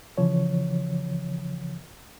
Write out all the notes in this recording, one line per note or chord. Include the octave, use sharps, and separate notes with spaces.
C#3 E3 F3 C#5